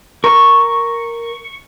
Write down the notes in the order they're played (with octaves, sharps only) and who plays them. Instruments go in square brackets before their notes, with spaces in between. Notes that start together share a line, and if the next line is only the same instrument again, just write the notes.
[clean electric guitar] A#4 [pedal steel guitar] C#6